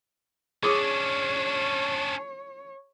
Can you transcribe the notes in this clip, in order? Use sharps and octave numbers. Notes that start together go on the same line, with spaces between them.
C#4 D4 G#4 C#5 D6 D#6